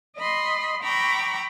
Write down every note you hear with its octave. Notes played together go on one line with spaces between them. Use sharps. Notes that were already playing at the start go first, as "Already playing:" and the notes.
D#5 B5 C6
G5 A#5 B5 C#6 D6 E6